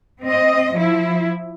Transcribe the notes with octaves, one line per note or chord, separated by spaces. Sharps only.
C4 D#5
F3 E4